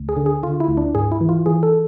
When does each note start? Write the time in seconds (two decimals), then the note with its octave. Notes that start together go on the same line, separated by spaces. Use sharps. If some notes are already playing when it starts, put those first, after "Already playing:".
Already playing: D2
0.09 G#4
0.17 D3
0.26 G#4
0.43 D3 F4
0.60 E4
0.68 D2
0.77 D4
0.95 G#2 G#4
1.12 E4
1.21 E3
1.29 F4
1.46 E3 G#4
1.63 A4